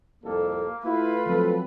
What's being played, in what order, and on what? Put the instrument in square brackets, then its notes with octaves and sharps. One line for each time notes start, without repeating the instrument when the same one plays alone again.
[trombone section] C2 F2 A4 [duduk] A#3
[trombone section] A3 F4 [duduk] E4 [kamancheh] B4
[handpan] F3 F#3 C4 [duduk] A4